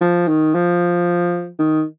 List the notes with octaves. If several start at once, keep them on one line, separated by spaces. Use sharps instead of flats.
F3
D#3
F3
D#3